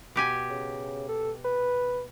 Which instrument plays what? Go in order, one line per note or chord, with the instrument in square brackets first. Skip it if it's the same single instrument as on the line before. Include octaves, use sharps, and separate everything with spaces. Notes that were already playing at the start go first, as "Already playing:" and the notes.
[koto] B2 G4 G#5
[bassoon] C#3
A4
B4